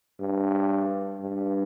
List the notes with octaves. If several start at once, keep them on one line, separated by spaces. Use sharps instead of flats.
G2
G2